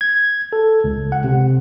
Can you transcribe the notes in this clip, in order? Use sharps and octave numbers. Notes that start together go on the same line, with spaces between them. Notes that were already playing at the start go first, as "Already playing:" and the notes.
G#6
A4
C#2
F#5
C3